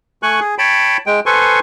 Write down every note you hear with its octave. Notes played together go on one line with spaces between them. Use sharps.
A3 G#5 C#6 F#6
G#4
C#5 G5 A5 B5
G#3 G5
A4 B4 C5 G#5 C6 C#6